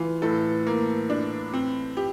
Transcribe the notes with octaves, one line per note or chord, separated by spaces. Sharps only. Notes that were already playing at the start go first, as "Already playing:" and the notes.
Already playing: E3 F4
A2 A4
A#3
D4
C4
G4